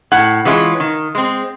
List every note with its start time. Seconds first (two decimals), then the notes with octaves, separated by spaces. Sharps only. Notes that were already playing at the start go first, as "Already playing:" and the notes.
0.12 A2 F#5
0.45 E3 G#3 C#4 F4
0.80 D#3
1.15 G#3 C4